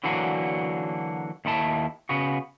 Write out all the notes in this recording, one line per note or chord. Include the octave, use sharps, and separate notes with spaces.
D3 E3 F#3 A#3 D4 F#4
D#2 D#3 E4 A5
C#3 B3 F#4